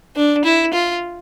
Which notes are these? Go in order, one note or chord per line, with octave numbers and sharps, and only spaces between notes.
D4
E4
F4